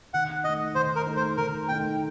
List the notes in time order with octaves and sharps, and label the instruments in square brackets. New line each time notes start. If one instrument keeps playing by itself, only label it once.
[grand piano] D#3 [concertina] F#5
[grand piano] A3 D#4 [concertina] D#5
[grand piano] D#3 [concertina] C5
[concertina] A#4
[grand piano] A3 D#4
[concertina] C5
[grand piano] D#3 [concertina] A#4
[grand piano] A3 D#4 [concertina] G5